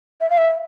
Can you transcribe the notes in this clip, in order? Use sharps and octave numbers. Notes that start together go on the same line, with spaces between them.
E5
F5
E5